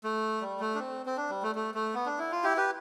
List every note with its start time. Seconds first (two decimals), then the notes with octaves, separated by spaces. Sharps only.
0.04 A3
0.41 G3
0.60 A3
0.75 D4
0.79 C4
1.06 C4
1.17 D4
1.30 G3
1.43 A3
1.55 A3
1.75 A3
1.94 B3
2.06 D4
2.19 E4
2.32 F4
2.44 E4 G4
2.57 G4 B4